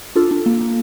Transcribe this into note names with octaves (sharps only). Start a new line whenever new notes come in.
D4 F4 A4
D4
A#3
A#3